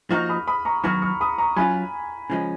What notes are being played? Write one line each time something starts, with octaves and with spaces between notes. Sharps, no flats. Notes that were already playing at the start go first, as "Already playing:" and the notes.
F3 A#3 D#4 F#4 C#6 F6
B5 D#6
B5 D#6
A#5 C#6
D#3 F#3 B3 F#4 C#6 F6
C#6 F6
B5 D#6
A#5 C#6
F#3 C#4 F4 G#5 B5
C#3 F3 G#3 C#4